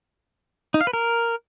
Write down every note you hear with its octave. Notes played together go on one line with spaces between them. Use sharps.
D#4
F5
B4
A#4